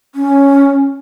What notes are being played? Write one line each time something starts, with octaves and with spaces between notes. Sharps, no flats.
C#4